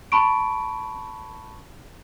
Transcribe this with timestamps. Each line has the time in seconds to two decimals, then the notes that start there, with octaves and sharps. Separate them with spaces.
0.12 A5 B5 C#6 D7